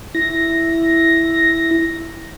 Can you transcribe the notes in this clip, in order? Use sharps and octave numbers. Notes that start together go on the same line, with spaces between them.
E4 A#6